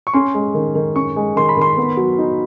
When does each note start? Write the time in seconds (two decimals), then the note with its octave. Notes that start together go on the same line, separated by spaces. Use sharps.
0.07 C#6
0.14 C#4 C6
0.34 G#3
0.54 D#3
0.75 D#3
0.96 C#4 C#6
1.16 G#3
1.36 D#3 C6
1.49 B5
1.57 D#3 C6
1.77 B3
1.97 F#3
2.18 D#4